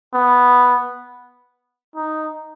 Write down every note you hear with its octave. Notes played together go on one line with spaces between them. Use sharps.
B3
D#4